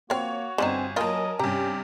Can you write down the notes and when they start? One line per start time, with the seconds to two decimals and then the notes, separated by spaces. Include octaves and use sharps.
0.10 F3 A#3 C4 F#4 C#5
0.58 G1 D3 B3 C4 D#4 G#5 E7
0.96 F#3 A#3 F4 A#4 D#5 G#5 A5
1.39 G2 C3 C#4 G4 A#5